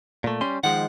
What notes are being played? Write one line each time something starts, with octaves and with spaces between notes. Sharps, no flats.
A#2 A3
G3 C#4 C6
D#3 F3 G#3 F#5